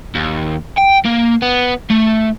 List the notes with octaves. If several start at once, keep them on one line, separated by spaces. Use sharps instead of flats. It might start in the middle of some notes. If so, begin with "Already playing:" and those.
D#2
G5
A#3
B3
A3